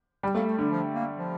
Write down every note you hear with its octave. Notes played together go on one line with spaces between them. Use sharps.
G3
A3 A#3
A3
D3 G3
F3
A#3
F3